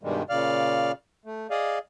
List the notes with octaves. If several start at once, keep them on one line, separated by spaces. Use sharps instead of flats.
G2 B2 D#3 G3 G#3
A#2 C#3 D5 F5 F6
A3
G#4 D5 D#5 F5